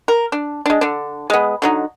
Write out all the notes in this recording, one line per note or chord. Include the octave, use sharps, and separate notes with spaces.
A#4
D4
G#3 D4
D3 D4
G#3 B3
D3 F#3 D#4